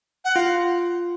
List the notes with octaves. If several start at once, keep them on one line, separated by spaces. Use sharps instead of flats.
F#5
F4 F5